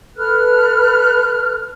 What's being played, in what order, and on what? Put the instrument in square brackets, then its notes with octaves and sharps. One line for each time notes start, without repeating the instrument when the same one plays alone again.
[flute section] A4 B4 F6 F#6